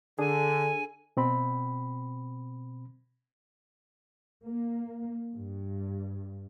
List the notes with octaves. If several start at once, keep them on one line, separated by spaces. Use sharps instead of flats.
D3 D4 G#4 A4 G#5
B2 C4 B5
A#3
G2